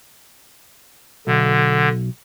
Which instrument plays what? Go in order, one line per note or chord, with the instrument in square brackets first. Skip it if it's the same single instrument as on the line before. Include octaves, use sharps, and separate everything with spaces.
[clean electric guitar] B1 [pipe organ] D3